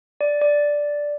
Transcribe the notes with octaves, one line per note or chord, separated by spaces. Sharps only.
D5
D5